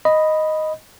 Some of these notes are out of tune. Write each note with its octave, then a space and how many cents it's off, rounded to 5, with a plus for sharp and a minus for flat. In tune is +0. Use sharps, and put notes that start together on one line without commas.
D#5 +0 B5 +0